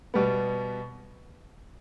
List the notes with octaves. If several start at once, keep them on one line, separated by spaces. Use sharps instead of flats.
B2 G3 B3